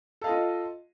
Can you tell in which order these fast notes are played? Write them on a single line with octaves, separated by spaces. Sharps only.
A4 F5 D#5 F4